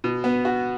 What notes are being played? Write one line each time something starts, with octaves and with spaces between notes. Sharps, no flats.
B2
B3
F#4